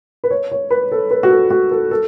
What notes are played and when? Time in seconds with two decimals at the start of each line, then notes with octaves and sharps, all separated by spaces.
0.24 B4
0.31 C#5
0.52 C#5
0.70 B4
0.92 A4
1.11 B4
1.23 F#4
1.30 A4
1.51 F#4
1.71 A4
1.91 A4